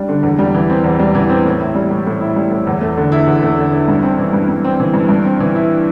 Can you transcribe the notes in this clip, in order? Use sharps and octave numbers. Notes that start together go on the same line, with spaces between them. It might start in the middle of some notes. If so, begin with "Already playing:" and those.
Already playing: G3 D4
D3
E2
G3
E3
C4
E2
G3
E3
C4
A2
E4
G3
A2
A2
E4
G3
A2
E2
A3
D3
E4
E2
A3
D3
E4
G2
C4
E3
G2
G2
C4
E3
G2
G2
C4
E3
E4